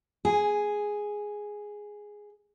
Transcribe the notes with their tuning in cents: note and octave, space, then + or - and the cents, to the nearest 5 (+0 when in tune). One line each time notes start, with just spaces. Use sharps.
G#4 +0 G#5 -15